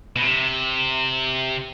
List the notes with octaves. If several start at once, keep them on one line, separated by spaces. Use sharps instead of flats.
B2
C3